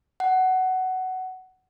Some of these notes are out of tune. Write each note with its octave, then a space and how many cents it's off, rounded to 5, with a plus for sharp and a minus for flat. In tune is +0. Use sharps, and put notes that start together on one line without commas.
F#5 +15